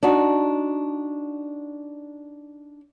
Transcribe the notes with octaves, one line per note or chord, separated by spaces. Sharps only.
D4 D#4 F#4